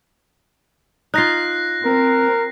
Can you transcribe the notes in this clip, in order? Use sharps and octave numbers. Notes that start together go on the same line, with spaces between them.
D#4 F4 F#6 A#6 C7
C4 A#4